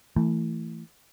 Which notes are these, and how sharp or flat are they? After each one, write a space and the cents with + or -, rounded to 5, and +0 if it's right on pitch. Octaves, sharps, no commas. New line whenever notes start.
E3 +0 A3 +25